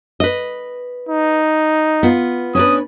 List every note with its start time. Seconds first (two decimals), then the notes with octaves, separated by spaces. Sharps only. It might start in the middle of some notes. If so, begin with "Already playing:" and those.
0.20 B4 D#5
1.09 D#4
2.03 B3 F4
2.55 C#4 D4 B4 D#6